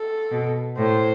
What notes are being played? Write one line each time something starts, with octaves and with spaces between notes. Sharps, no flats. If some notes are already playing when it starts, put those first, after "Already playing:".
Already playing: A4
B2
A2 C5